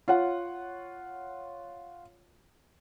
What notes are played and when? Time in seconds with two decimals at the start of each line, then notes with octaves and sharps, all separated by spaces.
0.08 F4 C#5 F#5